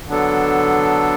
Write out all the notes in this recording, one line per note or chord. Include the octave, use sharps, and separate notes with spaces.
D3 F#3 B3 D4 A4